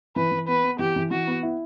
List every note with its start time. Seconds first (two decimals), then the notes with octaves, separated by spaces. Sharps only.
0.16 E3 B4
0.31 E3
0.48 B3 B4
0.64 B3
0.79 E3 G4
0.96 E3
1.11 E3 F#4
1.27 B3
1.43 E4